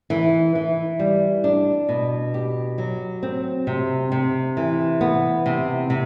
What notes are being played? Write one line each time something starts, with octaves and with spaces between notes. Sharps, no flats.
E3
E3
G3
D4
B2
G4
F#3
C4
C3
C3
E3
B3
C3
C3